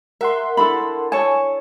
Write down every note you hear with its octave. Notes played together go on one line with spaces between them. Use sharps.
A#4 E5 F#5 C6
D4 E4 A4 B5
A4 C#5 G#5 A5